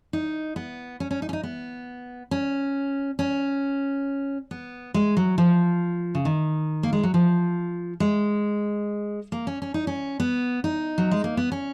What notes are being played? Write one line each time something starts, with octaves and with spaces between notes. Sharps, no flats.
D#4
B3
C#4
C#4
D#4
C#4
D#4
B3
C#4
C#4
B3
G#3
F#3
F3
C#3
D#3
A#3
G#3
F#3
F3
G#3
A#3
C#4
C#4
D#4
C#4
B3
D#4
F#3
G#3
A#3
B3
C#4